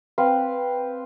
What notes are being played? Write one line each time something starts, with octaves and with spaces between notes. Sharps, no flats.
C4 B4 F5